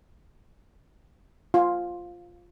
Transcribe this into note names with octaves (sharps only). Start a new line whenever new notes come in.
F4